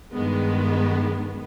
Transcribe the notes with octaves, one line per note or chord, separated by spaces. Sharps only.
G2 D#3 G#3 B3